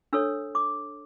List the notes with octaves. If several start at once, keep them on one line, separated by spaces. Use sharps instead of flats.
D4 A4 C#5 E6
D6